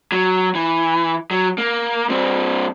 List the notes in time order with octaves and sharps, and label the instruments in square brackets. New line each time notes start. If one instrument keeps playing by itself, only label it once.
[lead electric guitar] F#3
E3
F#3
A#3
G2 C4